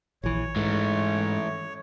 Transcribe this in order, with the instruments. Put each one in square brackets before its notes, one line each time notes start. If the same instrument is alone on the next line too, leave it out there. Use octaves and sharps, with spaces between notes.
[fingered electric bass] A#1 E3 [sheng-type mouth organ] C#5
[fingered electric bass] G#2 [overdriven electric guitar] E3 A3